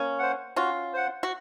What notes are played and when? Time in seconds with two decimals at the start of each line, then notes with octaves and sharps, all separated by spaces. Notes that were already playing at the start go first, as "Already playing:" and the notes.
Already playing: A#3 C#4
0.19 C5 F#5
0.56 C#4 F4 F#4
0.93 C5 F#5
1.23 F#4